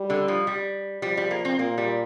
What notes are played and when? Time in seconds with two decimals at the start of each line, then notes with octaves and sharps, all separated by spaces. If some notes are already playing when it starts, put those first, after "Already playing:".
Already playing: G3
0.10 D3
0.28 F3
0.47 G3
1.02 F3 G3
1.17 G3
1.31 A#3
1.45 C4
1.58 A#2 A#3
1.78 G3